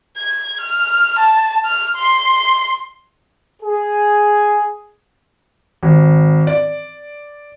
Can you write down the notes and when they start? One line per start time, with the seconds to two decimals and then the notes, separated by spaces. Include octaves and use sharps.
0.17 G#6
0.61 F6
1.19 A5
1.65 F6
1.96 C6
3.63 G#4
5.83 G#1
6.47 D5